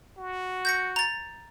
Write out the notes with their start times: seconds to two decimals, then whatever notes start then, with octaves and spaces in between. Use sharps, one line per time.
0.18 F#4
0.65 G6 A#6 C#7
0.96 A#5 A6